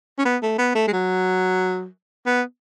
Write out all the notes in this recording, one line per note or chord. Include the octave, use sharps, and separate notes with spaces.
C#4
B3
A3
B3
A3
G#3
F#3
B3